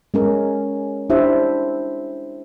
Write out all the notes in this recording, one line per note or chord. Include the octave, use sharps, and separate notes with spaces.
G#3 C#4 A#4
D4 E4 G4 C5 E5